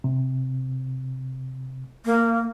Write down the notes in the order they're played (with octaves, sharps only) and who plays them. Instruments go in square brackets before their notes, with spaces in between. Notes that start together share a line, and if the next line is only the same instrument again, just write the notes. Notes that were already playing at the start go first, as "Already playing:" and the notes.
[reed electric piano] C3
[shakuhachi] A#3